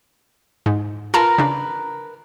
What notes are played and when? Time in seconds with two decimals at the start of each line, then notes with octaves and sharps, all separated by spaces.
0.66 G#2
1.14 F4 A#4 B4 A5
1.38 C#3 D4